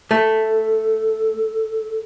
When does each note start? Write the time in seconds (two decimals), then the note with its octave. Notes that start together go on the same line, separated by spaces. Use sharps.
0.11 A3 A4